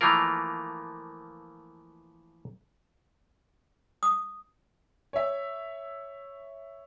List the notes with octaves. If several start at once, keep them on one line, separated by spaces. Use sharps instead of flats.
E3 F3 A3 A#3 F4 A#4
D#6
C#5 E5